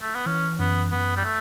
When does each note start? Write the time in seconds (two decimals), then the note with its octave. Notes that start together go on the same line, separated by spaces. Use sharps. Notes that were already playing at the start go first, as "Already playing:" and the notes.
0.01 A3
0.15 B3
0.26 E3 C#4
0.59 F#2 B3
0.92 F#2 B3
1.16 G3
1.25 A3